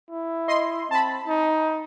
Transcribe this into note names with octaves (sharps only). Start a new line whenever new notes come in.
E4
D#5 C6
C4 A5 B5
D#4